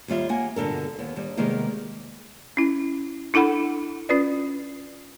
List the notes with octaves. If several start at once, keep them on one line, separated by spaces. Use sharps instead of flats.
D#2 G3 F4 E5
A#3 F#5 G#5
G2 B2 D3 A4 A#4
D#2 B3
D#2 G3
C3 D#3 G3 G#3 A#3 B3
C#4 E4
D4 E4 A4 F#5 B5
C#4 F4 B4 D5